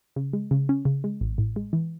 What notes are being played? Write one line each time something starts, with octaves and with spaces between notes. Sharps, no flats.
C#3
G#3
C#3
C#4
C#3
G#3
A1
A2
G#3
E3